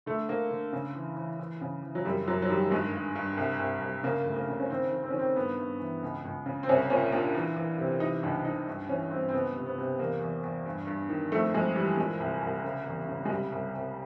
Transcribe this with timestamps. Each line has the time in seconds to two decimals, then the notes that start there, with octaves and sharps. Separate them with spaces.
0.06 D3 A3
0.29 D3 A#3
0.50 D3
0.73 C#3
0.95 E3
1.16 E3
1.39 E3
1.61 C#3
1.83 E3
1.95 F#3
2.05 F#2 G3
2.27 F#2 F#3
2.42 F#3
2.49 D#3 G3
2.71 G2 G#3
2.94 G2
3.16 G2
3.37 C2
3.59 C2
3.81 C2
4.03 C#3 A#3
4.26 D2
4.36 A#3
4.48 C#3
4.60 C#4
4.69 D#3 C4
4.92 D#3
5.03 C4
5.10 C#4
5.14 D#3
5.19 C4
5.36 G2 B3
5.59 G2
5.80 E3
6.03 C#2
6.25 C#2
6.46 C#3
6.63 C4
6.69 C2 C#4
6.90 A#2 C#4
7.12 A#2 D4
7.35 E3
7.56 E3
7.78 C3
8.00 E3 D#4
8.23 C#2 D4
8.45 C#2 D#4
8.67 G2
8.89 E3 C#4
9.11 G2 C4
9.29 C4
9.33 C#2 B3
9.55 C3
9.66 B3
9.78 C3
9.99 E2 A#3
10.21 E2
10.43 E2
10.66 G2
10.87 G2
11.09 D#3
11.32 F2 A3
11.54 F2 G#3
11.76 E3 G3
11.97 A#2 G#3
12.20 C2
12.42 C2
12.64 C#3
12.86 E2
13.09 C#3
13.25 G#3
13.30 C2 G3
13.52 C2
13.75 C2